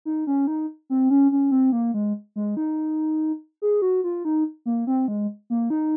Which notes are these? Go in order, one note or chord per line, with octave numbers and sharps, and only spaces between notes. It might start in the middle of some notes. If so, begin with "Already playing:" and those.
D#4
C#4
D#4
C4
C#4
C#4
C4
A#3
G#3
G#3
D#4
G#4
F#4
F4
D#4
A#3
C4
G#3
A#3
D#4